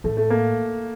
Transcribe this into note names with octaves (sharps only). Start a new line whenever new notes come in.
A2 A3
A3
A#3